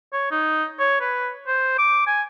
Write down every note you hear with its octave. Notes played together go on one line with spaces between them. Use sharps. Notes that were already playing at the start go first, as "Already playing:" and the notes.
C#5
D#4
C#5
B4
C5
D6
G#5